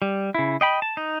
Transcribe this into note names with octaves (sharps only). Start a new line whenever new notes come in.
G3
C#3 E4
D#5 G5 B5
A5
D#4